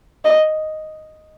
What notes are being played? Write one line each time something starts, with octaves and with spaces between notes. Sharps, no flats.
D#5